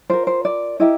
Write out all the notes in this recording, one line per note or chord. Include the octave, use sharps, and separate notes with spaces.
F4 A#4 C5
C5
D5
E4 G4 A#4 D#5